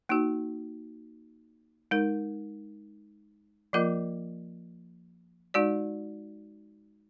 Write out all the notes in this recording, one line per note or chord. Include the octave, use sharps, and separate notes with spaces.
A#3 D#4 F#4
G#3 D#4 A#4
F3 A#3 F4 A#4 D#5
G#3 D#4 F#4 D5